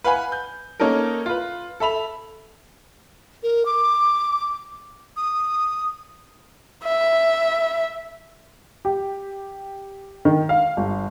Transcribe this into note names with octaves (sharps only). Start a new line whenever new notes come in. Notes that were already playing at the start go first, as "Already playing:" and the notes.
B4 F5 F#5 G#5 B5
G6
A#3 C#4 D#4 A4 A#4
F4 B4
A4 E5 B5 F7
A#4
D6
D#6
E5
G4
D#3
F5
G1